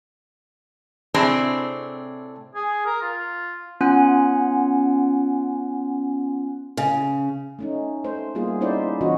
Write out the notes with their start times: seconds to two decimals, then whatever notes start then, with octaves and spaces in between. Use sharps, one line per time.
1.14 A2 C3 C4 D4 G#4
2.55 G#4
2.86 A#4
3.02 F4
3.81 B3 C#4 F4 F#5 G#5 F#6
6.77 C#3
7.59 A3 C#4 D#4
8.04 A3 C5
8.35 G3 A#3 B3 F4 G#4
8.61 C#4 D#4 E4 C5 D5
9.01 E3 C#4 F4 F#4 D#5